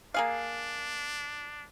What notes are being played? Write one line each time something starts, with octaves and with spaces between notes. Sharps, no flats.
A#3 D4 G#4 F5